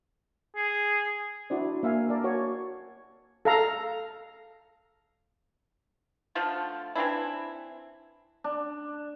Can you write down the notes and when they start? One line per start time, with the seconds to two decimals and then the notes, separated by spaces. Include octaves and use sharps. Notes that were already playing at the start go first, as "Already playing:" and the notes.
0.56 G#4
1.50 D4 E4 F#4 C5 D5
1.83 A#3 E5 F5 G#5
2.09 A#4 D5 A5
2.24 F#4 C#5 G#5
3.45 A4 F5 A#5
6.35 D3 F3 A3 F4
6.95 E3 C4 D4 E4
8.44 D4